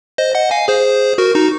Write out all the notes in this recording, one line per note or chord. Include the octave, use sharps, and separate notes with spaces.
C5 D#5
D#5 F#5
F5 G#5
G#4 C5
F#4 A#4
D#4 F#4